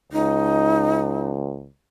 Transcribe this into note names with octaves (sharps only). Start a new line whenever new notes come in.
C#2 D#4